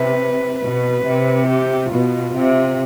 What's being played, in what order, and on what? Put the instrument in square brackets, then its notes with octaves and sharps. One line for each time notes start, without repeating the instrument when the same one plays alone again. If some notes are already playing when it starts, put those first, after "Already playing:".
Already playing: [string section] C3 [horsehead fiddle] B4
[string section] B2 [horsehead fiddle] B4
[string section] C3
[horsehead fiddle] G4
[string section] B2 [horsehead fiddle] F4
[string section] C3